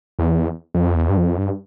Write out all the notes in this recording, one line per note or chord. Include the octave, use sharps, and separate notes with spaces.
E2
F2
E2
G2
F2
G2